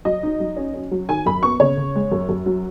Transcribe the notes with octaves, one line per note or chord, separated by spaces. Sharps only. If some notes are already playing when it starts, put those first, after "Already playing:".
F#3 D#5
D#4
F#3
C#4
C#4
F#3
D#3 G#5
F#2 B5
B3 C#6
C#3 C#5
C#3
G#3
F#2
F#2
F#3